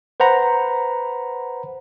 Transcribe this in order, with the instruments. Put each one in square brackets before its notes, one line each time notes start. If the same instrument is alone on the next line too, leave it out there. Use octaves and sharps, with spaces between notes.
[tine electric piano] B4 C5 F#5 A#5 B5